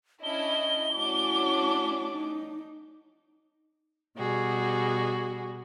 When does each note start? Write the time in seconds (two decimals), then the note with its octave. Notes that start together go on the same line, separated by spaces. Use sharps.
0.24 C#4 D4 E4 D#5 G7
0.94 A3 C#4 D4 E4 F#4 D6
2.11 D#4
4.16 B2 G3 F#4 G#4